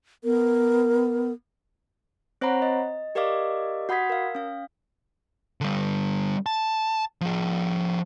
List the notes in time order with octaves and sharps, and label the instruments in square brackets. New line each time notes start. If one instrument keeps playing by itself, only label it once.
[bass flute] B3 [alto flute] A#4
[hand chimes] C4 C5 C#5 F#5 A#5 B5
D#5
G4 A#4 D5 D#5 F5 D6
F#4 F#5 B5 D#6 G#6 B6
A#4 F5
C#4 F5
[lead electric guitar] D3 G3
A5
F3 G#4